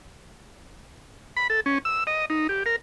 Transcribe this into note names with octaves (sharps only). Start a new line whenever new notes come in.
B5
A4
C#4
E6
D#5
D#4
G4
A#4